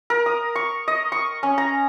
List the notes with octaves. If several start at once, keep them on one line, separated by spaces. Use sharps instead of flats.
A#4
D#6
C#6
D#5
C#6
C#4
A#5